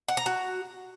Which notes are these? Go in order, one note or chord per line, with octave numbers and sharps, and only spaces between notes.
F#5
A#5
F#4